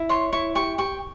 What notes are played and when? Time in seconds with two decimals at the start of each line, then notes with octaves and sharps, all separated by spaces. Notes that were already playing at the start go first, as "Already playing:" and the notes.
Already playing: E4
0.09 C#5 C6
0.33 E4 C#6
0.55 G4 C#6
0.78 G4 C#6